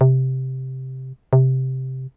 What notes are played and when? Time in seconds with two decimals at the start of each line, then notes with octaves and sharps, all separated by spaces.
0.01 C3
1.33 C3